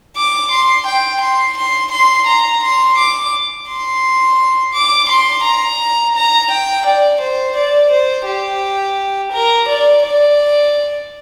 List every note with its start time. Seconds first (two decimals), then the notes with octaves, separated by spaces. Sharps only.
0.16 D6
0.51 C6
0.86 G5
1.21 C6
1.57 C6
1.92 C6
2.27 A#5
2.63 C6
2.98 D6
3.68 C6
4.74 D6
5.09 C6
5.44 A#5
6.16 A#5
6.51 G5
6.86 D5
7.21 C5
7.56 D5
7.91 C5
8.26 G4
9.32 A#4
9.68 D5
10.03 D5